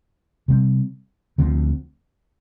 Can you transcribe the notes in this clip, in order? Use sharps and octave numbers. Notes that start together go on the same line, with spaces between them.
C3 G3 C4
D2 D3 F3 C4